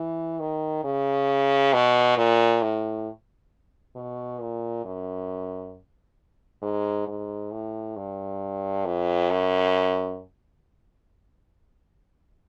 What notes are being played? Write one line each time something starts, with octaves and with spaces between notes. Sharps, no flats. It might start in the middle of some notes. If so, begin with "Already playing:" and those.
Already playing: E3
D#3
C#3
B2
A#2
A2
B2
A#2
F#2
G#2
G#2
A2
G2
F2
F#2